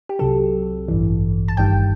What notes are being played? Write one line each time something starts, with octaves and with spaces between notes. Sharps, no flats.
G4
C2 C3 F#3 A4
A1 G2 E3
A5
G1 G2 D#3 G3 G5